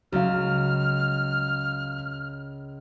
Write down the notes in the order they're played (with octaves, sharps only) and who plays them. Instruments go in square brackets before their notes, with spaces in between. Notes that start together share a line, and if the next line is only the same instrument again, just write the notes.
[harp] C#2 [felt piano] F#3 F5 [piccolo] F6